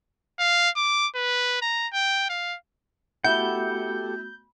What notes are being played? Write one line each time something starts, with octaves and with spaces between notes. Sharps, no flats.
F5
D6
B4
A#5
G5
F5
A3 B3 E4 F#4 G4 A4 F#5 G6